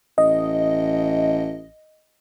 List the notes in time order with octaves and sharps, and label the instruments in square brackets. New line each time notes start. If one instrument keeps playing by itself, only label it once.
[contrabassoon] A1 [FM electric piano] D#5